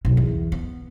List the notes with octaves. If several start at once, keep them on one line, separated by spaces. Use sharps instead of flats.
B1
E2
B3